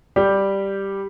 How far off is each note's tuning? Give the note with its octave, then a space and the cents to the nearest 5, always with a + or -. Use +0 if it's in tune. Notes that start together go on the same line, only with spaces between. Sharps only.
G3 +0 G4 +0